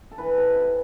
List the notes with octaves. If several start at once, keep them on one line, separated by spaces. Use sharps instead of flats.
A4
E3 B4
C3
C3